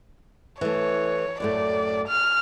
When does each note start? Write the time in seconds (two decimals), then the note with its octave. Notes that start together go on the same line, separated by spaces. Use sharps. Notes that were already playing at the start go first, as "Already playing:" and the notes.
0.61 E3 A3 C#5
1.40 F#2 A2 A3 D5
2.08 F6